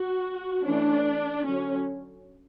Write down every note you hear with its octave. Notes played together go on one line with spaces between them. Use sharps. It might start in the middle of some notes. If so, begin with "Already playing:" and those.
Already playing: F#4
E3 A3 C#4 D4
D3 F#3 C#4